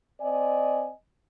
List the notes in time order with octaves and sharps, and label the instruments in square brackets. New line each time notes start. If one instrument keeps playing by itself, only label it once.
[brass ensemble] C4 D5 D#5 G#5